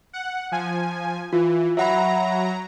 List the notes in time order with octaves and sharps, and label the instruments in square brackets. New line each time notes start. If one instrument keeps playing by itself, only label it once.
[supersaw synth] F#5
F3 G#5
[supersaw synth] E3 [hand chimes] F4
[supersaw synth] F#3 A#5 [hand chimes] E5 F#5 B5